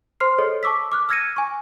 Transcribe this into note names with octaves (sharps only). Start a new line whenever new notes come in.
C5 C6 F6 C7
G#4 A4 C#5 D#5
A5 C#6 D6 E6 B6
D6 F6 F#6
E6 F6 G#6 A#6 C#7 D#7
G#5 C#6